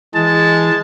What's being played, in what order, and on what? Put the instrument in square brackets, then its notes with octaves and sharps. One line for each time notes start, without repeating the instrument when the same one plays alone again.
[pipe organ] E3 [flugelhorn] G#3 [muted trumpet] A5